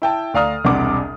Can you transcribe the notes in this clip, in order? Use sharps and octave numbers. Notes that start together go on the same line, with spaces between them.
E4 G5 A5
D2 D5 F5 A#5 D#6 F6
E1 C2 C3 F#5 D6